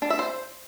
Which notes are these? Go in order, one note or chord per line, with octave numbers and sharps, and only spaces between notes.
D4
E5
C5